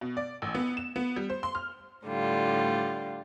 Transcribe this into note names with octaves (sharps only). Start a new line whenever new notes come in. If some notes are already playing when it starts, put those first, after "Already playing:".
B2
D5
A1
B3
E7
B3
G3
C5
C6
F6
A2 D3 G3 F4